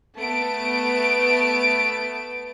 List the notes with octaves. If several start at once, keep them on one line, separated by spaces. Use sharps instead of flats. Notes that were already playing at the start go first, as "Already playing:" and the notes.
A3 B3 A5 D7